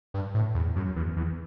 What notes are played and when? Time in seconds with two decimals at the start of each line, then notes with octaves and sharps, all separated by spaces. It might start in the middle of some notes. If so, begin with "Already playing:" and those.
0.14 G2
0.34 A2
0.55 E2
0.76 F#2
0.96 E2
1.16 E2